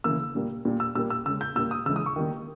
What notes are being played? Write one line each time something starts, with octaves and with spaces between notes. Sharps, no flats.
C#3 E3 A#3 E6
A#2 G3 A#3
A#2 G3 A#3
E6
A#2 G3 A#3 E6
E6
C#3 G#3 E6
G6
A#2 G3 A#3 E6
D#6
C#3 E3 G#3 E6
D#6
C#6
D#3 G3 A#3